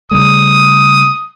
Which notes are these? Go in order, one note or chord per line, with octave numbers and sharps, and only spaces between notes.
C#3 G3 A3 D#6